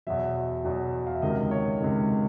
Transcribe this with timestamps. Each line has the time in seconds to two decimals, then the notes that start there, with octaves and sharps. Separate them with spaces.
0.07 E2 B2 F#3 E5
0.64 E2 B2 F#3
1.07 F5
1.15 E5
1.22 C#2 C3 D#3 D#5
1.51 C#5
1.81 C#2 C3 D#3